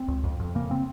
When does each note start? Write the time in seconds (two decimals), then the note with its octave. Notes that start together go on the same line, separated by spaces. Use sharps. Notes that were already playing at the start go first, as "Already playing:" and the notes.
Already playing: C4
0.08 C#2
0.24 F2
0.40 F2
0.55 C#3 A#3
0.71 C4